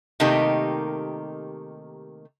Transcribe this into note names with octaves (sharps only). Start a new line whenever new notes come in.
C3 D#3 A3 A#3 D#4 G4